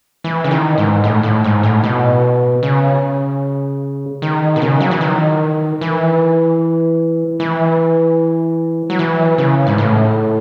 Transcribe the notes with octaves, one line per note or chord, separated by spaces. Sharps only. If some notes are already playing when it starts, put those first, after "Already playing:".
E3
C#3
D#3
G#2
A2
A2
G#2
A2
B2
C#3
D#3
B2
C#3
F#3
E3
D#3
E3
E3
F#3
E3
C#3
G#2
A2